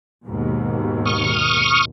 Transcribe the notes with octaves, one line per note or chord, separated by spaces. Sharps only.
D#2 G#2 B2
C#6 D#6 F6